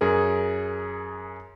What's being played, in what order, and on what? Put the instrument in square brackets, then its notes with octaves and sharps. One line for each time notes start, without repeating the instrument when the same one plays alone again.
[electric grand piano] F#2 G#4 A#4